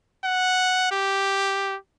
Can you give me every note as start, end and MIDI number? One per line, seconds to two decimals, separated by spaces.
0.24 0.87 78
0.91 1.76 67